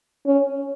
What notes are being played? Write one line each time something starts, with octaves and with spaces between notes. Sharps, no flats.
C#4